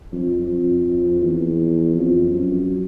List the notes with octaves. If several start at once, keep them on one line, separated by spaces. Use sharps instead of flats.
F2
F2
E2
F2
F#2